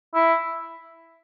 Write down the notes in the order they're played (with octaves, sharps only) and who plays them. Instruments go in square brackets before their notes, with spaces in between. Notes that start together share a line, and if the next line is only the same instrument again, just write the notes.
[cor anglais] E4